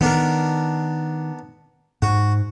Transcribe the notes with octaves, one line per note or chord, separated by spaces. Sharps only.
D#3 B3 D4 A#4
G#2 F#4